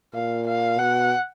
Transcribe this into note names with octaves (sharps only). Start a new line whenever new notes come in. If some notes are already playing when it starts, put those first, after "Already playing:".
A#2 F5
F5
B2 F#5